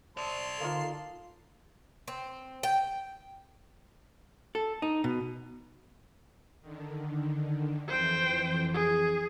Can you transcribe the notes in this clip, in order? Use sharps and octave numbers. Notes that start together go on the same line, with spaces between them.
C5 D5 A5 C6
D3 A#3 D#4 F4
C4
G5
A4
D#4
B2
D3 D#3
F2 E3 C5 G5
G#4